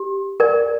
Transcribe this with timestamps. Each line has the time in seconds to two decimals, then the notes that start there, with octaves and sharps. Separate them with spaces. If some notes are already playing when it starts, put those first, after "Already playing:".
Already playing: G4
0.40 A#4 D5